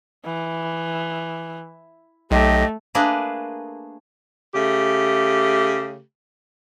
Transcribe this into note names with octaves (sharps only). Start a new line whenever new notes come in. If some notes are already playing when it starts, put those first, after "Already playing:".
E3
B1 A3 G4 D#5
A3 A#3 D4 G#4 A#4 B4
C#3 A3 G4